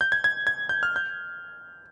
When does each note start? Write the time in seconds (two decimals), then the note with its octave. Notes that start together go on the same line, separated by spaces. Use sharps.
0.01 G6
0.12 G#6
0.24 G#6
0.47 G#6
0.69 G6
0.83 F6
0.96 G6